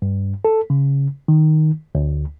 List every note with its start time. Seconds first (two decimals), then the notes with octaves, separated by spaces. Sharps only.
0.02 G2
0.45 A4
0.70 C#3
1.28 D#3
1.95 D2